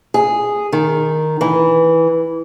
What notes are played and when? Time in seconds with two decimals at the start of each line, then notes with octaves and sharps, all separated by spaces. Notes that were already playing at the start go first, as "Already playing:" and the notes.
0.14 G#4
0.72 D#3
1.41 E3